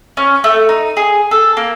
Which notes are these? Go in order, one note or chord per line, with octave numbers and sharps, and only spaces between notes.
C#4
A3
D#4
G#4
A4
A#3